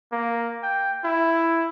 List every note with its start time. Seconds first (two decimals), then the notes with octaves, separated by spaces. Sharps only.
0.12 A#3
0.63 G5
1.04 E4